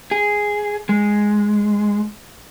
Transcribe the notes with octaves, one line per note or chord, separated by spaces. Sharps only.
G#4
G#3